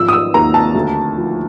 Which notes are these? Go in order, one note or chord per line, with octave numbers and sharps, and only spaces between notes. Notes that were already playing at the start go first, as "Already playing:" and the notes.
Already playing: G#1 F3 E6
D#6
E6
D#2 A#5
A5
D2
F3